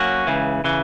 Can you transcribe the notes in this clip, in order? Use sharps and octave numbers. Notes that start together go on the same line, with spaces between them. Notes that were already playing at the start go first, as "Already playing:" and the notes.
Already playing: F#3 A#3 C#4 F#4
C#2 C#3 E3
C#3 E3